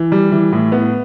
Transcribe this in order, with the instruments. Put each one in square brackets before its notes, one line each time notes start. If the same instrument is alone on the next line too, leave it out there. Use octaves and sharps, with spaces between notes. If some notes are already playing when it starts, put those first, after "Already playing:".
Already playing: [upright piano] E3
G3
E3
A2
B3